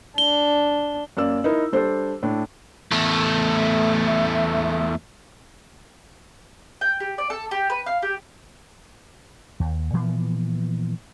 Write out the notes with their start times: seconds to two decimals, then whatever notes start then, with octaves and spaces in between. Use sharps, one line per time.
0.18 D4 G7
1.17 F#2 A#3 D5 E6
1.44 D#4 E4 A#4
1.73 G3 D4 A4 C5
2.23 A2 D4
2.92 E2 A3
6.81 G5
7.00 G4
7.18 D5
7.30 A4
7.51 G4
7.70 B4
7.86 F5
8.02 G4
9.60 D#2
9.93 A#2 E3 F3 B3